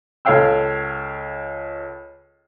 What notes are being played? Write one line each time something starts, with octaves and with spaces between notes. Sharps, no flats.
C#2 A4 C#5 F5 G5 E6